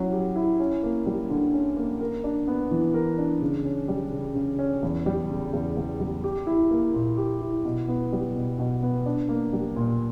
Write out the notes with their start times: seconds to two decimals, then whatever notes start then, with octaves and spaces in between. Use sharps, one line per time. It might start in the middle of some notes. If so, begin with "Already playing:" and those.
Already playing: F#3 C#4 E4
0.12 G4
0.36 E4
0.60 C#4
0.83 A#3
1.06 G3
1.30 D3
1.54 C#4
1.77 A#3
2.01 A#4
2.24 D4
2.47 B3
2.71 E3
2.94 A#4
3.18 D4
3.41 C#3
3.65 C#4
3.88 G3
4.12 C#3
4.35 C#3
4.59 C#4
4.83 E2
5.06 G3
5.30 C#3
5.53 E2
5.77 E2
6.00 G3
6.24 G4
6.47 E4
6.71 A#3
6.94 A#2
7.17 G4
7.41 E4
7.65 B2
7.88 B3
8.12 G3
8.35 B2
8.59 B2
8.82 B3
9.06 D4
9.29 A#3
9.53 G3
9.76 A#2